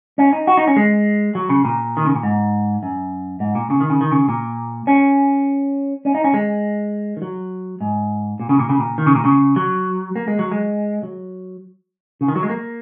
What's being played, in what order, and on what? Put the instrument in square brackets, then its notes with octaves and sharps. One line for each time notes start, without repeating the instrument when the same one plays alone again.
[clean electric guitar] C#4
D#4
F#4
D#4
C#4
G#3
F#3
C#3
A#2
D#3
C#3
A#2
G#2
F#2
G#2
A#2
C#3
D#3
C#3
D#3
C#3
A#2
C#4
C#4
D#4
C#4
G#3
D#3
F#3
G#2
A#2
C#3
A#2
C#3
A#2
D#3
C#3
A#2
C#3
F#3
A#3
G#3
F#3
G#3
F#3
C#3
D#3
F#3
G#3
A#3